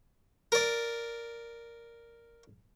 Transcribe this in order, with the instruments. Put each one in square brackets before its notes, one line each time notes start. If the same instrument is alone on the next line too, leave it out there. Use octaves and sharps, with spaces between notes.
[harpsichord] A#4 D5